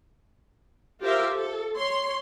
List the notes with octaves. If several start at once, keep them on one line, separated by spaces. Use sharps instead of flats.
F4 G4 A#4 C5 E5
A4
C#5 C6